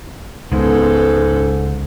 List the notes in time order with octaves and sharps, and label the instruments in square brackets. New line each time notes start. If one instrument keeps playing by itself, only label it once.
[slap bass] C#2 G#3 [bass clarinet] G#2 [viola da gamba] C#3 B3 A4